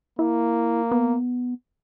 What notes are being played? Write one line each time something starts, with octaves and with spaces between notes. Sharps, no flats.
A#3 E4
B3